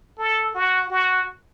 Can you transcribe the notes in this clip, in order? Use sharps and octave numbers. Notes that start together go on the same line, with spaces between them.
A4
F#4
F#4